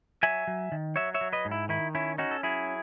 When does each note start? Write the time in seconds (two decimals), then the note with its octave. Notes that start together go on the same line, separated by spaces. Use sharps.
0.23 F#3 E5 G#5
0.47 F#3
0.72 D#3
0.96 F#3 C#5 E5
1.14 C#5 E5
1.21 F#3
1.33 B4 D#5
1.45 G#2
1.51 E4
1.69 D#3 E4
1.95 C#4 E4
2.18 C#4 D#4 F#4
2.31 A4
2.43 F#3 E4 G#4